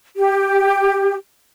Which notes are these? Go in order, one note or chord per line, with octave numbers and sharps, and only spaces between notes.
G4